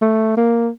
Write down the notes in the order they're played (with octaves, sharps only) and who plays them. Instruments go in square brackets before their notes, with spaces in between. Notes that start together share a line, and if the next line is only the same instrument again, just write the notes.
[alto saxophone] A3
A#3